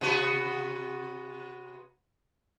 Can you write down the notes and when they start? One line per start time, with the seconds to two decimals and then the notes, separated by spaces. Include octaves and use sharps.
0.01 C3 B3 F#4